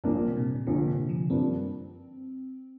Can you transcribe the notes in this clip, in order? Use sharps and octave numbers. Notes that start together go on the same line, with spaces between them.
A#1 G2 A#2 A#3 D4
C3
A#2
C3
A#1 A#2 D3 A#3 D4
C3
F3
G2 F3 A#3 C4 D4